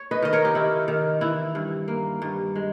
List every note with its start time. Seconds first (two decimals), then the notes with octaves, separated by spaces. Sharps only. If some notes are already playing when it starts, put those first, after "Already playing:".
Already playing: C#5
0.11 B4 D#5
0.22 D#3 D#5
0.33 A#4 C#5
0.45 G4
0.55 D#3 E4
0.88 D#3
1.21 E3 E4
1.55 G2
1.88 A#3
2.22 G2
2.55 G#3